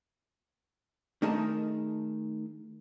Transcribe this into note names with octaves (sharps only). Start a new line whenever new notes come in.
D#3 A3 D#4 G#4 A#4 A5